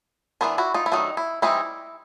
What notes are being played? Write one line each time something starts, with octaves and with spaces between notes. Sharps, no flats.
E3 G#3 B3 D4 A#4 C5
E4 F#4
D#4 F4
E4
D#3 F#3 A3 D4 D#4
E4
E3 G3 C4 D#4 E4